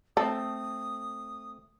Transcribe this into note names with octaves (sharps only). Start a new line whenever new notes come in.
A3 C4 A4 D#6